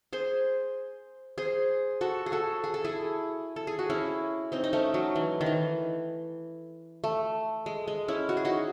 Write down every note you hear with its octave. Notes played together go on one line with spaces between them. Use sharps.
G#4 C5
G#4 C5
F#4 A4
G#4
F#4 A4
G#4
A4
E4 G#4
A4
G#4
F#4
C#4 E4
C4 D#4
D#4
A3 C#4
F#3
E3
D#3
E3
A3
G#3
G#3
C#4 E4
F#4
G#4
D#4 F#4